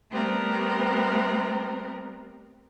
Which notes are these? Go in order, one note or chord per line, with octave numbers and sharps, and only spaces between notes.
G3 A3 B3 C4 A#4